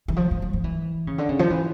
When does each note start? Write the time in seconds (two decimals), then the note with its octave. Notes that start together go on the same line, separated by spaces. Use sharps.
0.08 E3
0.17 F3
0.31 F3
0.42 F#3
0.53 F3
0.64 E3
1.07 C#3
1.18 D3
1.29 C#3
1.39 F3
1.50 E3